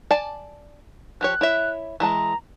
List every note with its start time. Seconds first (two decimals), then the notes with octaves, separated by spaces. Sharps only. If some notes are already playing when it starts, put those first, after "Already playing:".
0.11 D5 G#5 A5
1.21 F3 G4 C#5 F#6
1.41 E4 C#5 E5
2.00 E3 G#3 A5 A#5